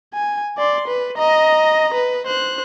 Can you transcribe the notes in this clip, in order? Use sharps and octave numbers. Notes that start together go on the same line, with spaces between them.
G#5
D5 C6
B4
D#5 A#5
B4
C5 F#6